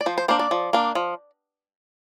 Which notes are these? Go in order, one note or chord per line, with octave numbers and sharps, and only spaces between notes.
D5
F3 C5
C5
A#3 D4 C5
D5
F3
A#3 D4
F3